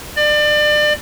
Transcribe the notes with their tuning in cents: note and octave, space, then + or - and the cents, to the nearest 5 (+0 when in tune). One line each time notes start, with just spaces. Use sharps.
D5 +30